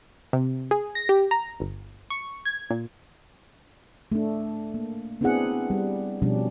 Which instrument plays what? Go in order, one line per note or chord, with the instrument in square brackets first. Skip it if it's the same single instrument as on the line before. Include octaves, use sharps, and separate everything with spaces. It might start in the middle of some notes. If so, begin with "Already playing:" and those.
[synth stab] C3
G#4
A#6
G4
A#5
G1
C#6
G#6
A#2
[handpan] A3 D4
A#3
B3 C4 D4 E4 G#4 F#5
G3
B2 F3 G3 C#4 D4